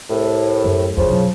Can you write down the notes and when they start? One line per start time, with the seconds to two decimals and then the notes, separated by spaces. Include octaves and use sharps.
0.09 C2 A2
0.64 F#2 A3
0.97 F1 F2 C#3 F3
1.10 B2 F#3